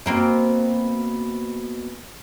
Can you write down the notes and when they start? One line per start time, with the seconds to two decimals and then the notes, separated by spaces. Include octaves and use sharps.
0.06 B2 A#3 C4